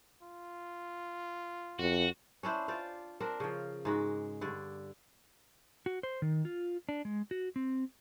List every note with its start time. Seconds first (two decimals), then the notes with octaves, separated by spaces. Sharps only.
0.22 F4
1.79 F2 F#4
2.43 C#4 D4 E4 C5
2.68 F4 C5 D5
3.20 C4 D4 A#4
3.40 C#3 F3
3.85 G#2 G#3 F#4
4.41 G2 D3 D5
5.86 F#4
6.03 C5
6.22 D#3
6.45 F4
6.89 D4
7.05 G#3
7.31 F#4
7.56 C4